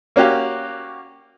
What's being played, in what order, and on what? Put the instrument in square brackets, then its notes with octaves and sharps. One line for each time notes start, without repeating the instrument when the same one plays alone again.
[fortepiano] A#3 C#4 F#4 G4 F5